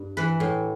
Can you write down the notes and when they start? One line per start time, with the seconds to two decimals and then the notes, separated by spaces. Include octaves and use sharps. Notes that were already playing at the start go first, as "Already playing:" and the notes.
Already playing: G2
0.17 E3 B4
0.40 A2